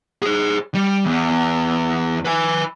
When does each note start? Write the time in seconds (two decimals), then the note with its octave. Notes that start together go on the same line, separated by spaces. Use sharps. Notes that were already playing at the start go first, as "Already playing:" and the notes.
0.22 G#4 C5
0.74 G3
1.05 E2
2.25 B4 G#5